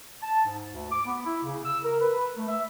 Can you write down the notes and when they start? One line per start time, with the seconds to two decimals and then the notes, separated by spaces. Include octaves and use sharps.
0.22 A5
0.45 G#2
0.73 D2
0.91 D6
1.05 B3
1.25 E4
1.43 C#3
1.65 E6
1.83 A#4
2.00 B4
2.36 A3
2.48 E5